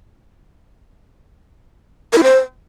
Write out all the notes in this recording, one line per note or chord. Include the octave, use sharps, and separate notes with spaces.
A#4
E4
C5